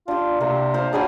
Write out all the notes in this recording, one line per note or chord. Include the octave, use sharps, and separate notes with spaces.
D4 F4 G4
C3 A#3
F4 C5 F5
F#3 G3 D4 G#4